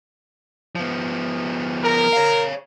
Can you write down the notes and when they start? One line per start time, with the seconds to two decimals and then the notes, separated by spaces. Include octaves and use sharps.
0.75 F3 B3
1.84 A#4
2.13 C#5 F5